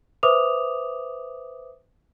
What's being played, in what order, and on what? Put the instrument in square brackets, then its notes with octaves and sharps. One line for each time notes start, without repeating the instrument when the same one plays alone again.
[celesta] B4 C5 E5 D6 D#6 F7